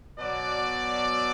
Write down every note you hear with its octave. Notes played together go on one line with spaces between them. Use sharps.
B2 F#3 D5